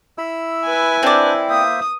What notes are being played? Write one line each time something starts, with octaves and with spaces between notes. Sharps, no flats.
E4 B5 E6
B4 G#5
C4 D4 C5 D5
A#3 C5 E5 D#6